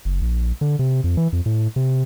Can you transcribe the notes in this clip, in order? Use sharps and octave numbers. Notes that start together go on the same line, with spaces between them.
F#1
A#1
D3
C3
F2
E3
F2
A2
C3